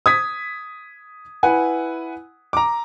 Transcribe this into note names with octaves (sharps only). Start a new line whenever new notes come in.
D#6 G#6 B6
E4 B4 F#5 G#5
A#5 D6